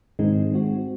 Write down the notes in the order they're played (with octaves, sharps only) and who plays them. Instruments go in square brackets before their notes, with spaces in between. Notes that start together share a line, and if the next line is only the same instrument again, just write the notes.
[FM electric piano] G#2 D#3 G#3 C4 D#4
G#3 C4 F#4